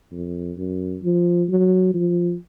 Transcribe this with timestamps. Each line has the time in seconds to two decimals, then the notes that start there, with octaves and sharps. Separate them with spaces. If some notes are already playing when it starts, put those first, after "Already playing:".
0.11 F2
0.57 F#2
1.03 F3
1.49 F#3
1.94 F3